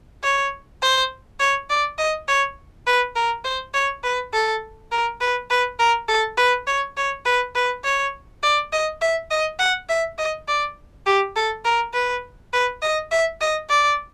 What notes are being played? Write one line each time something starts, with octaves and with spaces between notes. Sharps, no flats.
C#5
C5
C#5
D5
D#5
C#5
B4
A#4
C5
C#5
B4
A4
A#4
B4
B4
A#4
A4
B4
C#5
C#5
B4
B4
C#5
D5
D#5
E5
D#5
F#5
E5
D#5
D5
G4
A4
A#4
B4
B4
D#5
E5
D#5
D5